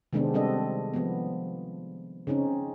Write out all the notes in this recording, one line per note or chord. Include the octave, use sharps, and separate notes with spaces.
C3 D#3 G#3 B3 C4 D4
G3 C4 D4 A4 D#5
F3 B3
C#3 C4 C#4 D#4